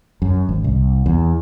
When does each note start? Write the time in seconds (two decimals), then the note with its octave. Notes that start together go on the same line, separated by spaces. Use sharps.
0.22 F#2
0.49 G#1
0.64 C2
1.06 E2